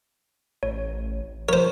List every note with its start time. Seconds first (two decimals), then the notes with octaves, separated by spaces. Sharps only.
0.63 A1 C#5
1.49 F3 A#4 C5 C#5